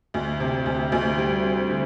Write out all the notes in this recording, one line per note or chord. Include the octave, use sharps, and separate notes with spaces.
D2
C3
D2
D2
G3
C4
D3